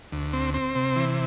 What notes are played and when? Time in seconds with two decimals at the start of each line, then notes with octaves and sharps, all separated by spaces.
0.12 D2
0.33 C4
0.54 C4
0.75 C3
0.96 E3